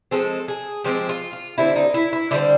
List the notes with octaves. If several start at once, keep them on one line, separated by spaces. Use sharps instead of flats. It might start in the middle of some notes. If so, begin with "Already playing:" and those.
F3 G#3 C4 A4
G#4
F3 G#3 C4 G4
F4
F4
D3 G3 C4 E4
D#4
E4
E4
D3 G3 C4 E4